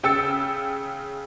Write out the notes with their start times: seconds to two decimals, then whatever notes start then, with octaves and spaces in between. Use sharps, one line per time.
0.03 C#3 G5 E6 A6 C#7